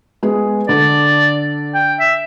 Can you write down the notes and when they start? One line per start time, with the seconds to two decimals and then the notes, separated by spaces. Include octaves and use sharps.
0.23 G#3 B3 G#4
0.69 D3 A4 D5
1.74 G5
2.00 E5